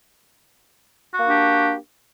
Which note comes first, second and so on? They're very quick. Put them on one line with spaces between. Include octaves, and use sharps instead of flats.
F#4 A#3 D4 G4